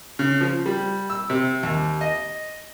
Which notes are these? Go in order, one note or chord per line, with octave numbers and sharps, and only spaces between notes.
C#3
F3
G3
E6
C3
D#2
D#5